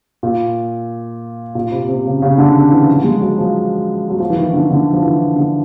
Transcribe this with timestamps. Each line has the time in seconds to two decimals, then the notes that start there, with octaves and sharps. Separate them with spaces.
0.23 A#2
1.55 A#2
1.71 C3
1.88 C3
2.05 C#3
2.22 C#3
2.38 D3
2.55 D#3
2.72 E3
2.87 F3
3.04 G#3
3.22 F#3
3.38 F3
4.09 F#3
4.20 F3
4.30 E3
4.37 D#3
4.53 D3
4.71 D3
4.93 F3
5.03 E3
5.20 D#3
5.36 D3